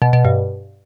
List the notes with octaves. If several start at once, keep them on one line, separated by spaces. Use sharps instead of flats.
B2
B2
G2